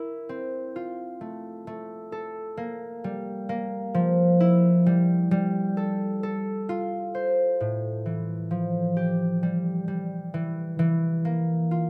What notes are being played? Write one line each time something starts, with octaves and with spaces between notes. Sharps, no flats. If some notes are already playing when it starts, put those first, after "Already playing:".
Already playing: E4 A#4
C4
F4
A3
A3
A4
A#3
G3
A#3
F3
E4
G3
G3
A4
A4
F4
C5
A2
E3
F3
G4
G3
G3
E3
E3
A#3
F4